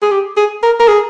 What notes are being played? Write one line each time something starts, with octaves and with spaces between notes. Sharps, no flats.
G#4
G4
G#4
A#4
A#4
G#4